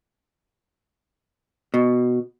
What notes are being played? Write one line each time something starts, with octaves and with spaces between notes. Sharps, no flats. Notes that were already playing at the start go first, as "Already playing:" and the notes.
B2